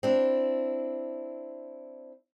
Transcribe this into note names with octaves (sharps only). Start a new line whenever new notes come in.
C4 D4 E4